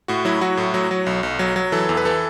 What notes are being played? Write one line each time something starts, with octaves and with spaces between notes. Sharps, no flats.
A2 F#4
F#3 E4
F#3 F#4
A2
F#3
F#3
B1
B1
F#3
F#3
E3 A4
E2
B4
E3 A4